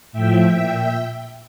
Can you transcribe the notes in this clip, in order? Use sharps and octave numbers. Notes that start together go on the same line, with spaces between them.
A2 F3 E5 G5
A#2